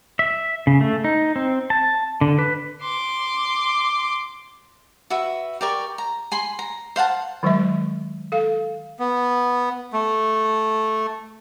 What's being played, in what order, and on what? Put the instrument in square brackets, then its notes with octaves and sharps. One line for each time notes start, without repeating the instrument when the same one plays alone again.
[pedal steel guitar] E5
C#3
A3
D#4
C4
A5
D3
B4
[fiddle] C6 D6
[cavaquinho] F#4 B4 E5
G4 A#4 D5 C#6
A#5
G#5 B5 C6
A#5
C5 F5 F#5 A5
[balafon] D#3 F#3 G#3 E5
A4 F5
[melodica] B3
A3